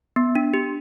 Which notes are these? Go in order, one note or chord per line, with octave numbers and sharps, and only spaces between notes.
B3
D4
G4